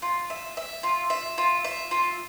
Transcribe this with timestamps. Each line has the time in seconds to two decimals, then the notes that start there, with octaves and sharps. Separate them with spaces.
0.02 F4
0.30 E5
0.57 E5
0.83 F4
1.10 E5
1.38 F4
1.64 E5
1.91 F4